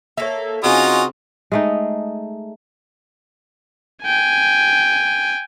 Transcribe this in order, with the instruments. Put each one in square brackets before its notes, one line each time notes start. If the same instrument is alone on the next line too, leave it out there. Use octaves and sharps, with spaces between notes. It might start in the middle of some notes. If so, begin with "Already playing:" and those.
[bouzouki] A#3 A4 [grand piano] C#5 E5
[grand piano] C#3 C4 C#6 [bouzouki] C#4 [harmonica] D#4 F4 D#6 [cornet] F#4
[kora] G#3 A3 D#4
[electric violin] G5 G#5